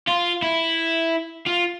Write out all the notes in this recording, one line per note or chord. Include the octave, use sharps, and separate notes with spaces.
F4
E4
F4